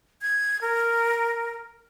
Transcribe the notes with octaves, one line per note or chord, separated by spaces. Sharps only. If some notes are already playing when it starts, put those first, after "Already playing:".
G#6
A#4